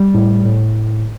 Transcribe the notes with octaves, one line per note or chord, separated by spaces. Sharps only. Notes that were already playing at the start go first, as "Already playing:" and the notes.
Already playing: G3
A2
A2